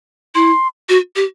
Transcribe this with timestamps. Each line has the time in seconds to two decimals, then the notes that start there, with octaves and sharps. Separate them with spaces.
0.35 E4 C6
0.89 F#4
1.16 G4